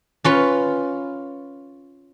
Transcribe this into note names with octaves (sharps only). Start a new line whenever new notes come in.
C#4 F4 B4